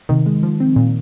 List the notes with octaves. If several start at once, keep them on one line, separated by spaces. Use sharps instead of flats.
C3 D#3
G#3
F3
C4
A#2